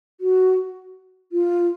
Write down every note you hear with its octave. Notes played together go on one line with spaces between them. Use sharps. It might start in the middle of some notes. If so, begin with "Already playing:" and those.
F#4
F4